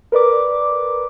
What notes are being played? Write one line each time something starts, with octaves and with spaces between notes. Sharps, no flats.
A#4 B4 D5 D6